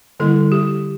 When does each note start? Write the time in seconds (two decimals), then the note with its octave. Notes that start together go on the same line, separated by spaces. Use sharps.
0.20 D3 G3 A#3 E4 A4
0.52 G4